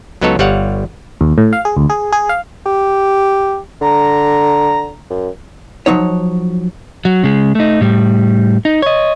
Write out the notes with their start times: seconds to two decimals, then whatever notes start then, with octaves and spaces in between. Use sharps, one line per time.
0.21 C#2 F#3 B3 D#4 A4 C#5
0.39 G1 G3 C#5 F5 F#5
1.21 D#2
1.38 A2
1.53 F5
1.65 G#4
1.77 D2
1.90 G#4
2.12 G#4
2.29 F5
2.66 G4
3.82 D3 A#5
5.10 F#2
5.86 F3 F#3 D#4 C#5
7.05 F#3
7.24 C#3 G#3
7.55 A3 D#4
7.81 A2 G3
8.65 D#4
8.82 C#5 D#5